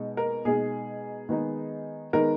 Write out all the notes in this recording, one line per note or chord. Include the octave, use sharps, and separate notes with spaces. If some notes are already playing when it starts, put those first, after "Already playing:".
Already playing: B2 G#3 D#4
A#4
B2 G#3 D#4 G#4
D#3 G#3 B3 D#4
D#3 G#3 B3 D#4 A#4